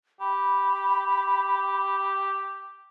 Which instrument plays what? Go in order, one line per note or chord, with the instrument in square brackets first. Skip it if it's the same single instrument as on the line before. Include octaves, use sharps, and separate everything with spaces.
[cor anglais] G4 [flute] B5